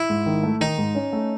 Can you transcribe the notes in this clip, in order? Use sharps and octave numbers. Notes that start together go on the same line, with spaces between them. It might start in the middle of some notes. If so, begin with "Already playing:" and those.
Already playing: E4
G#2
D#3
A3
D#3 D#4
G#2
C#4
A3